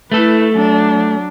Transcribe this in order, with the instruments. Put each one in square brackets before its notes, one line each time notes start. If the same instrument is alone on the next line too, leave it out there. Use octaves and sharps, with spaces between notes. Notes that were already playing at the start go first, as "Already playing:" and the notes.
[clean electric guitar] A3 A4 [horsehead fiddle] E4 B4
[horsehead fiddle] F#3 D4